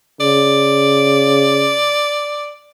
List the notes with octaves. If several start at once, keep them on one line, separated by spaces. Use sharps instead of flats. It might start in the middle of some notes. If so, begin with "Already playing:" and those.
C#3 D5